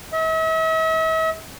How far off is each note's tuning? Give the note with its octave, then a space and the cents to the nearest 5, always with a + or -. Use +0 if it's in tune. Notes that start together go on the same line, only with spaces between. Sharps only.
E5 -45